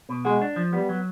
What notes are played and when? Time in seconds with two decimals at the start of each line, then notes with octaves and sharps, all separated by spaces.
0.09 B2
0.25 G#3 F#4
0.41 D4
0.56 F3
0.73 G3 B3
0.89 F#3